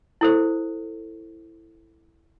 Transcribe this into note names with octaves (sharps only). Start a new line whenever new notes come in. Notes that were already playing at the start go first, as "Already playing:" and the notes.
E4 A4 C5